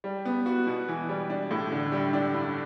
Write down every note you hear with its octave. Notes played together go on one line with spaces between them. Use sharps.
G3
B3
F#4
B2
E3
G3
D4
A2
D3
G3
D4
G2